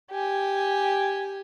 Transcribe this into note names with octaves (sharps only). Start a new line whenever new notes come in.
G4 G#5